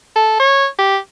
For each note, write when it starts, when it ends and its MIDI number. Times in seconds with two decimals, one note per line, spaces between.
0.16 0.35 69
0.40 0.67 73
0.78 0.97 67